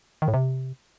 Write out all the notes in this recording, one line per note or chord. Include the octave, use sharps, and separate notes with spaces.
D#3
A2
C3